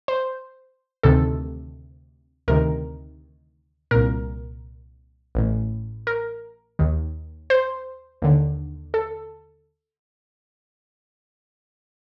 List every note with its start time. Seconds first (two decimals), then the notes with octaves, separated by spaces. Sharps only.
0.08 C5
1.03 D2 C3 D#3 A4
2.48 D2 C3 D#3 A#4
3.91 C2 A#2 A#4
5.35 A1 A2
6.07 A#4
6.79 D#2 D#3
7.50 C5
8.22 D#2 D3
8.94 A4